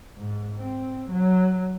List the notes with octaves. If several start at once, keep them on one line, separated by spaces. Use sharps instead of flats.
G#2
C4
F#3